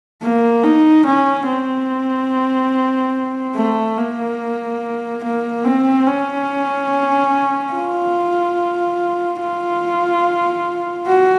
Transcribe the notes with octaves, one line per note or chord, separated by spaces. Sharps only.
A#3
D#4
C#4
C4
A3
A#3
A#3
C4
C#4
F4
F4
F#4